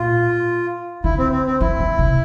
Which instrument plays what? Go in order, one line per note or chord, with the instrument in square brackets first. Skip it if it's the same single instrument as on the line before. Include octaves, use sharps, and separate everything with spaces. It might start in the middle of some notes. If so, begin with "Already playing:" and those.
Already playing: [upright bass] A#2 [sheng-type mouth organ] F4
[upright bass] D3 [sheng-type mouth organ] E4
[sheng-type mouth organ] C4
C4
C4
[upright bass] E3 [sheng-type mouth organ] E4
[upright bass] D3
C3